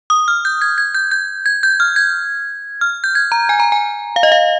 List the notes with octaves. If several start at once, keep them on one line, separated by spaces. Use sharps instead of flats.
D#6
F6
G6
G#6
G#6
G6
G6
G#6
G6
F6
G#6
F6
G6
G#6
A#5
G#5
A#5
G#5
F5
D#5
F5